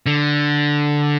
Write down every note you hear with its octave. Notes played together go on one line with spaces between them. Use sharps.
D3